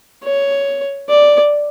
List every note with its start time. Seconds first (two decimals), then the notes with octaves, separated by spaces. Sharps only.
0.24 C#5
1.09 D5